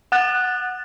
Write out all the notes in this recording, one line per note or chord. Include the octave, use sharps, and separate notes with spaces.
F#5 F#6 A6